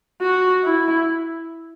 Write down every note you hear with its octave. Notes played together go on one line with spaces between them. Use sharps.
F#4
E4